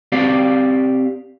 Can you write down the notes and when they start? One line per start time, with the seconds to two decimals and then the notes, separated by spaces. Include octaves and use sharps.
0.12 C4 G4 D5 F5